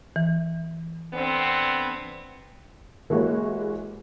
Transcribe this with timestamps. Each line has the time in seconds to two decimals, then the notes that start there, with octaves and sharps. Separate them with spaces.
0.16 E3
1.14 D3 B3 C4
3.10 E3 G#3 A#3 F#4 G4 C#5